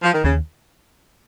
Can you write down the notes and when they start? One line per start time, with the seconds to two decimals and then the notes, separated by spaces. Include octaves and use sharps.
0.03 F3
0.14 D#3
0.24 D#2 C#3